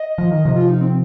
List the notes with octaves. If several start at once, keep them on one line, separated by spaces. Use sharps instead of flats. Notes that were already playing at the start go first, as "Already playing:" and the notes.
Already playing: D#5
F3
D#3
C3 F3
F4
D#4
C4